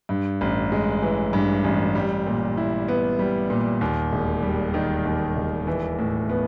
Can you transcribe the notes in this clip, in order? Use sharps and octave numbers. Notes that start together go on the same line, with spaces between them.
G2
A1
G#3
E3
G2
A1
G3
A#2
E4
B3
G3
A#2
D#2
E1
G3
D#3
D#2
E1
E3
A2
B3